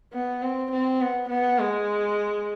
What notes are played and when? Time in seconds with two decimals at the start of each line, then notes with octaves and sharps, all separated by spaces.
0.13 B3
0.42 C4
0.72 C4
1.01 B3
1.29 B3
1.59 G#3